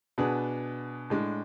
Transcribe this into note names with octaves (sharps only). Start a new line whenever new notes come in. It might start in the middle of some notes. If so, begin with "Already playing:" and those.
B2 B3 D4 G#4
A2 G#3 D4